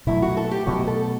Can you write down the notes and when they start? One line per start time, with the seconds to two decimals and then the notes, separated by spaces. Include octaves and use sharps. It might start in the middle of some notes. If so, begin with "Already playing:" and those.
0.07 B2 F#3 A3 E4
0.22 F#4
0.37 A4
0.51 G4
0.67 B2 F#3 A3 F#4
0.87 A4